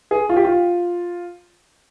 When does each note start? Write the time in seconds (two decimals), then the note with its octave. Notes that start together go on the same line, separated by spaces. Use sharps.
0.11 G#4
0.29 F4
0.36 G4
0.44 F4